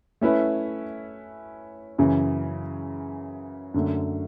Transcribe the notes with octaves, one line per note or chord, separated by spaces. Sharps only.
A3 C#4 E4 B4
F#2 C#3 E3
F#2 D3 A3